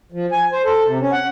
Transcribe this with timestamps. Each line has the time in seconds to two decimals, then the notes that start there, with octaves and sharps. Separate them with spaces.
0.12 F3
0.32 G#5
0.53 C5
0.64 A4
0.85 C3
1.01 C#4
1.12 F#5